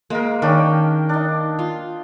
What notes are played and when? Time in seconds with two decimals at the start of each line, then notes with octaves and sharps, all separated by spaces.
0.10 G#3 A#3 A#4
0.42 D#3 C#4 D4 G5
1.09 D4 D#4
1.59 F4